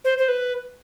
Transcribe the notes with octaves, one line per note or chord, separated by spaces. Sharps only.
C5
C5
B4